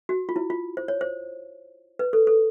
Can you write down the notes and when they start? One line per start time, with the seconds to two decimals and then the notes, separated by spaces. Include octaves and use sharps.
0.09 F#4
0.29 F4
0.36 E4
0.50 F4
0.77 C5
0.88 C#5
1.01 C5
1.99 B4
2.13 A4
2.27 A4